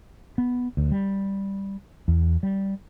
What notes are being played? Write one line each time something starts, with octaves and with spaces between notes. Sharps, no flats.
B3
D2
G3
E2
G3